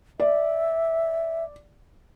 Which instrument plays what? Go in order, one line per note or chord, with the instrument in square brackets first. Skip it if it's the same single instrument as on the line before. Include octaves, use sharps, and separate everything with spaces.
[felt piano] D5 [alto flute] E5